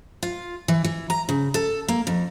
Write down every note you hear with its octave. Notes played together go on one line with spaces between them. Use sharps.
F4
E3
E3
A#5
C#3
A4
A#3
F2